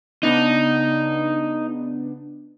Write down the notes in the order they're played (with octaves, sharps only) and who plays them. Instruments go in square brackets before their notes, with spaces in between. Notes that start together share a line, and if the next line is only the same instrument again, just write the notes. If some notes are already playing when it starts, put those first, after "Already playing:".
[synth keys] C#3 B3 D4 [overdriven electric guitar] D#4